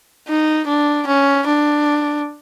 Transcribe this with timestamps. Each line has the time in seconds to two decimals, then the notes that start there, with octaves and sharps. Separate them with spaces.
0.28 D#4
0.67 D4
1.07 C#4
1.47 D4